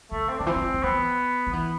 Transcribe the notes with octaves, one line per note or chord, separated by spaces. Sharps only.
D3 A3
C4
D3 D4
E3 C4
F3
E3
F3
E3 B3
F3
E3 B3